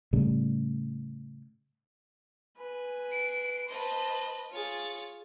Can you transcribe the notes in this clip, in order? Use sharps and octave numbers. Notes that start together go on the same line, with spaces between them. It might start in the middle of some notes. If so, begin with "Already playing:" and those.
A2 C#3 G3
B4 G#5
C7 D7
B4 C5 D#5 A5
F4 G#4 C#5 A6